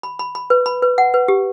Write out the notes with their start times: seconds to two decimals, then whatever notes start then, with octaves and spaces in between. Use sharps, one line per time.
0.03 B5
0.19 B5
0.35 B5
0.50 B4
0.66 B5
0.82 B4
0.98 F#5
1.14 B4
1.28 G4